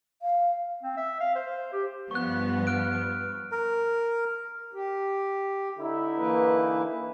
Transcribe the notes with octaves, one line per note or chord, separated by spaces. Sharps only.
F5
C4
E5
F5
C5
G4
G2 F3 B3 C#6 F#6
F6 F#6 D7
A#4
G4
D3 D#4 E4
E3 A#3 B4